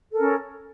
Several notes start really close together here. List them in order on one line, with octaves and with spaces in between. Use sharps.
A4 A#4 C#4